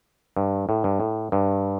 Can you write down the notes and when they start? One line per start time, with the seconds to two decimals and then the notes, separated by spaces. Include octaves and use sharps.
0.37 G2
0.69 A2
0.84 G2
1.00 A2
1.32 G2